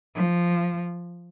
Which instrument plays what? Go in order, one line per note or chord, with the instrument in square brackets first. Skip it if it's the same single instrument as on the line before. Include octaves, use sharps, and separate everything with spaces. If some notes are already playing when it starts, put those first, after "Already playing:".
[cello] F3